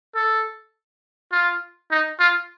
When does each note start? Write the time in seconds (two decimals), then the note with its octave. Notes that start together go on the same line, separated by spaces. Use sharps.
0.15 A4
1.32 F4
1.91 D#4
2.20 F4